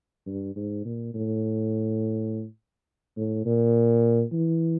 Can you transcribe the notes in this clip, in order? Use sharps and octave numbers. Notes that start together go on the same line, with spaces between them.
G2
G#2
A#2
A2
A2
A#2
E3